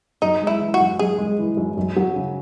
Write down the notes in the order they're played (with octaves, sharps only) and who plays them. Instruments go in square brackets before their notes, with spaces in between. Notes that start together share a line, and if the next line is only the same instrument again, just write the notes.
[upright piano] F#2 [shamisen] D#4
[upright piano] G#3
[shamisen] E4
[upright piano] E3
[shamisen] F#4
[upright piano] F#2
[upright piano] F#2 [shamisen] G#4
[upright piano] G#3
E3
F#2
F#2
F#3
C#3